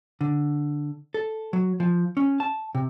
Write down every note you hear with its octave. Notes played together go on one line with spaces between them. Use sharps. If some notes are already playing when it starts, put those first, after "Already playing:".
D3
A4
F#3
F3
C#4
A5
C3